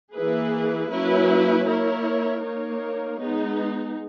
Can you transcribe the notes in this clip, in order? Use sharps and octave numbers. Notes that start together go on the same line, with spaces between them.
E3 A#3 E4 G#4 B4
F#3 A#3 C#4 E4 B4
A#3 E4 A#4 C#5
A#3 D#4 A#4 C#5
G#3 B3 D#4